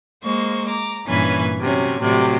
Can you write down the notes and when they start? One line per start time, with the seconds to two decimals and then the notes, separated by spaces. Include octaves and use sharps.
0.22 G#3 A#3 C5 C#6
0.66 A#5 D6
1.06 G2 A#2 E3 C#4 B4 G#5
1.60 C3 F#3 C#4
1.99 A2 C3 F#3 G3